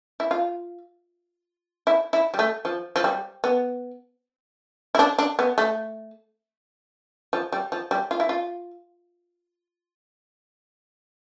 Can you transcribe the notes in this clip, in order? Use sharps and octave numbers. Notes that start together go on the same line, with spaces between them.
E4
F4
E4
E4
G3
A3
F3
F3
G3
B3
E4
D4
D4
B3
A3
F3
G3
F3
G3
F4
E4
F4